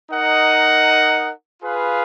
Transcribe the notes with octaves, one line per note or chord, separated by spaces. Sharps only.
D#4 A#4 D#5 F#5
F4 G#4 B4 F5